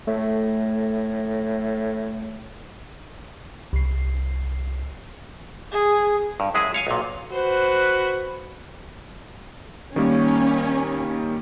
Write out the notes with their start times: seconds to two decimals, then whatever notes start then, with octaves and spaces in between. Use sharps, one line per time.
0.07 A2 A3
3.73 C2 C7
5.72 G#4
6.40 G2
6.54 F#2 G#3 E4 G#4
6.74 C#5 F5 G#5
6.87 B1 A#2
7.32 F#4 B4 C5
9.96 D#3 G3 A#3 C#4